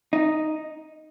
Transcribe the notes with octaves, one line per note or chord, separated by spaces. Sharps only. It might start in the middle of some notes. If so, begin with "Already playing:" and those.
D#4